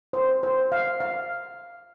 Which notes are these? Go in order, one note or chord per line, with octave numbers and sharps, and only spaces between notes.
C5
C5
F5
F5